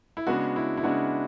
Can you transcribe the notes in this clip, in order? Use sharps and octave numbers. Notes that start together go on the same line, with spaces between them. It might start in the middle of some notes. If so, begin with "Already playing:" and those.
E4
C#3 G#3 B3 D4 F#4
E4
E4
C#3 G#3 B3 D4 F#4